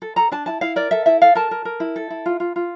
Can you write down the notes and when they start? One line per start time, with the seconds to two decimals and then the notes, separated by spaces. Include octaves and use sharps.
0.02 A4
0.16 A4 A#5
0.32 D4 A5
0.46 E4 A5
0.61 E4 F5
0.76 A#4 D5
0.91 A4 E5
1.06 E4 E5
1.22 A4 F5
1.35 A#4 A5
1.51 A#4
1.65 A#4
1.80 E4
1.96 A4
2.10 E4
2.26 F4
2.40 F4
2.56 F4